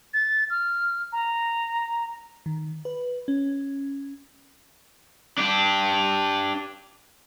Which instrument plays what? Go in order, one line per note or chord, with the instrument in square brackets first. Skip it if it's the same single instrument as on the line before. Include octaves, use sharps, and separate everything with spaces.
[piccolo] A6
F6
A#5
[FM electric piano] D#3
B4
C#4
[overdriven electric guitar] D4 G4